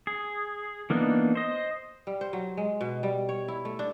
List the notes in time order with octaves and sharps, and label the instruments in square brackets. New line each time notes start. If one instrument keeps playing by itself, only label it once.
[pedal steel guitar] G#4
E3 A#3 B3 D4 D#4
C5 D#5
[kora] G3
C5
F#3
G#3
B2
G3
C#5
E4
A3
D4